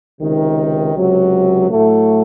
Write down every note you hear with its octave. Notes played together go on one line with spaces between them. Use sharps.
C#2 C3 D#3
C#2 C3 F#3
A2 F#3 A3